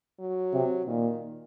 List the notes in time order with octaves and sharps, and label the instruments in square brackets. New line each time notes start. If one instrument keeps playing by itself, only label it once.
[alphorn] F#3
[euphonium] C3
[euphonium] A#2 [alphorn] D#3